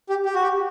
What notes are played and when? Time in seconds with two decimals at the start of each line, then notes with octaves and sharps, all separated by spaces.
0.09 G4
0.26 G4
0.34 F#4
0.43 G4